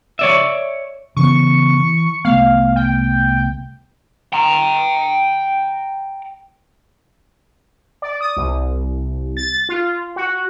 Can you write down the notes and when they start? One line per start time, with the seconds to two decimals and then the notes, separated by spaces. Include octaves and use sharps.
0.19 C#5 D5 E5
1.16 C#3 E3 B3 C#6
1.77 E3
2.25 C2 A3 B3 F5
2.76 G5
4.33 G5 A#5
8.02 D5
8.21 D#6
8.37 C2
9.37 A6
9.69 F4
10.16 F#4